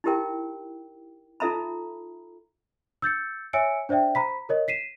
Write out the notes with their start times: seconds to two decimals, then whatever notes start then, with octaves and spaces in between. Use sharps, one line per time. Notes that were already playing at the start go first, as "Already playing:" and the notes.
0.04 D#4 E4 G4 A#4 G5
1.40 D#4 F4 A4 E5 A#5 B5
3.02 E6 G6 A6 C#7
3.53 C#5 E5 G#5 E6 C#7 D7
3.89 D4 C5 D5 E5 G5
4.15 C5 A#5 B5 B6
4.49 A#4 C#5 D#5
4.68 B6 C7 D#7 E7